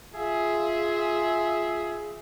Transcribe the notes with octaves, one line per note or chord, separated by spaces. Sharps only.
F4 G#4 E5